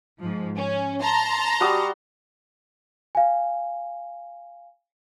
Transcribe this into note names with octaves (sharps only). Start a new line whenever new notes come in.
G#2 F3
C#4
A5 A#5 C6
G3 F#4 D#6
F5 G#5